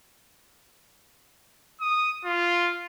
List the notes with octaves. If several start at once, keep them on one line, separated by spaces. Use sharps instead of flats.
D#6
F4